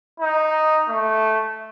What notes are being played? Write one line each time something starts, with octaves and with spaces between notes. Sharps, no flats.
D#4
A3